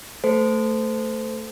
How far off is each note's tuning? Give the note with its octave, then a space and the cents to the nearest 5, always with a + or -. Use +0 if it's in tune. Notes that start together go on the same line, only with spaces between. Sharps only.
A3 +10 A4 +0 C5 -25